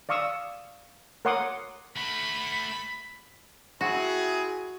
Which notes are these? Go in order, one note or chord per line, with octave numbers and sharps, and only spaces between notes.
D5 F5 C#6 D#6 E6
A#4 C#5 F#5 C6 D6 D#6
A3 F#4 B5
C4 E4 F#4 G#4